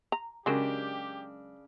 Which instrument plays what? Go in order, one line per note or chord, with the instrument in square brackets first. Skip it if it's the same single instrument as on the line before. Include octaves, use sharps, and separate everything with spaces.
[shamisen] A#5
[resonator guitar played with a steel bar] C#3 D4 [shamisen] F#3 G#3 [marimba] C#4 A#4 D#6 [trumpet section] G4